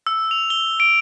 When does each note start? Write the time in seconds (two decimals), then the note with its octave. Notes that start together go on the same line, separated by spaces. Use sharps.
0.07 E6
0.31 F7
0.50 G7
0.80 D7